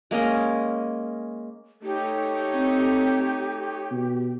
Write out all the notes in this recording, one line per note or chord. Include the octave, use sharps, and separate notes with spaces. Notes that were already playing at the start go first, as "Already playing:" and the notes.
G#3 A#3 C#4 D#5
A3 D#4 G4 C#5
C4
B2